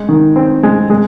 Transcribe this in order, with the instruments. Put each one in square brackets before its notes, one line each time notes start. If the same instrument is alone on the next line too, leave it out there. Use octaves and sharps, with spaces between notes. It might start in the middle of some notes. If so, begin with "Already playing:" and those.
Already playing: [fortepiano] G#3
D#3
C4
G#3
G#3